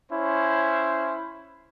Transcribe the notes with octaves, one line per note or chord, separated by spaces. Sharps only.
C#4 E4 C5